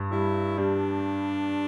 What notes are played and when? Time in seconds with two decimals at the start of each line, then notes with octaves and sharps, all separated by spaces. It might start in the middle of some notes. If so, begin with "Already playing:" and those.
Already playing: G2
0.11 G3 E4
0.58 G3 D4